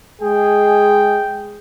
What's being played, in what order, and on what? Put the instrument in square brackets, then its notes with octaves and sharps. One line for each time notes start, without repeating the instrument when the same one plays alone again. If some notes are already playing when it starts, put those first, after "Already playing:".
[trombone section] G#3 G#4 [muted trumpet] G5